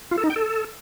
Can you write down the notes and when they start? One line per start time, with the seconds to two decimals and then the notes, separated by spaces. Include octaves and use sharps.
0.11 F4
0.18 A4
0.24 D#4
0.30 G5
0.36 A4